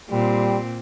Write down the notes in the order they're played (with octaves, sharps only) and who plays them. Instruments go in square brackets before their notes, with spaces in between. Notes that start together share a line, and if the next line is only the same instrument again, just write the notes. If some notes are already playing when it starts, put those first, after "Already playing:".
[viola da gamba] A#2 C4 [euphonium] G3